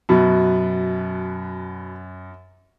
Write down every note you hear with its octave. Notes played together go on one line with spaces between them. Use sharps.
F#2 B2